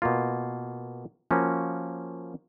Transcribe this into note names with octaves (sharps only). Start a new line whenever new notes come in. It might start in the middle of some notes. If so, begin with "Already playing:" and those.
B2 A#3 F4
F3 A#3 C#4 F#4